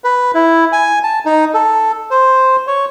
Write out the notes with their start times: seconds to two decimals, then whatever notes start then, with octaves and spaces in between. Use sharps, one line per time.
0.04 B4
0.34 E4
0.72 G#5
1.03 A5
1.25 D#4
1.54 A4
2.11 C5
2.67 C#5